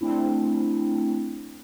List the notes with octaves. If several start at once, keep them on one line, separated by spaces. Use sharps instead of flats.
A3 C4 D4 E4